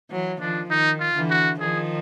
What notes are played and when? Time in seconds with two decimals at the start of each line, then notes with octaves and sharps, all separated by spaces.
0.11 E3 F#3
0.40 D#3 F3 D4
0.70 D#3 D#4
1.00 F4
1.15 D3 E3
1.30 F#4
1.59 D#3 F3 G#4